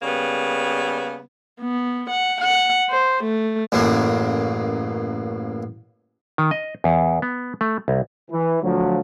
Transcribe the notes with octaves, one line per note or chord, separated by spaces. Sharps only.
C#3 G3 A#3 B3
B3
F#5
F#5
C5
A3
A1 F#2 C#3 A#3
D#3
D#5
E2
B3
A3
C2
E3
D2 F3 F#3